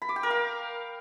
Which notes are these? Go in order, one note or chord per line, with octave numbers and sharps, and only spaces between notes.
B5
D6
G5
A#4
F5